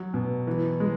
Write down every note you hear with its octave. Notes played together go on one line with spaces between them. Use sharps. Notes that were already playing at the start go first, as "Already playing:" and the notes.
Already playing: F#3
B2
E3
G#3